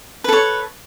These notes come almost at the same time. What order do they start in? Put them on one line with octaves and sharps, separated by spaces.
B4 A4 C#5